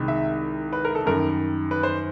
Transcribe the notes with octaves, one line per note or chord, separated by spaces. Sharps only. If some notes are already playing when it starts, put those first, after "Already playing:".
Already playing: C2 C3 D#3 G#3
E5
B4
A#4
A4
F#2 D#3 G3 A#4
B4
C5